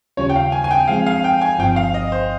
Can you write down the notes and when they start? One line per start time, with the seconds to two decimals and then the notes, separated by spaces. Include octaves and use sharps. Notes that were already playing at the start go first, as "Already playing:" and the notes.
0.17 D#2 C#3 G3 C#4 F4 C#5
0.29 G5
0.36 F5
0.52 G#5
0.64 G#5
0.71 G5
0.88 F3 G#3 C4 F5
1.07 F5
1.24 G5
1.42 G#5
1.59 G1 G2 F3 C4 G5
1.76 F5
1.94 D#5
2.12 C5